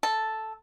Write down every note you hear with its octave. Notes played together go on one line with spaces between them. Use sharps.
A4